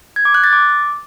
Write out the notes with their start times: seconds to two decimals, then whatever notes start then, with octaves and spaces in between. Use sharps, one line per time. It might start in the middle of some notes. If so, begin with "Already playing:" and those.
0.16 G#6
0.25 D6
0.34 F#6
0.44 A6
0.53 D6